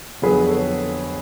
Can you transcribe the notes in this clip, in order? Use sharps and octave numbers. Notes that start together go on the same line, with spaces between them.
F2 D3 F#3 B3 G#4 B4
A4 C#5